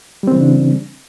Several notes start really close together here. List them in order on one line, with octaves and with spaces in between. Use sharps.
G3 C4 E3 C#3 D4